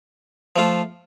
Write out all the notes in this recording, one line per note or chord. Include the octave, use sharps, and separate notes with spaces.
F3 A3 F4